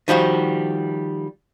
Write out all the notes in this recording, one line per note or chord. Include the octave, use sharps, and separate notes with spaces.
D#3 F3 G3 F#4